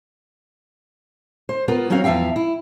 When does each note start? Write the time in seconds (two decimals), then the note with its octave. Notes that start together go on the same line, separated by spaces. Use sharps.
1.49 C5
1.68 B3 F4 A#4
1.90 F#3 C4 C#4 F#4 F5
2.04 E2 F3 E5 F5 G5
2.36 E4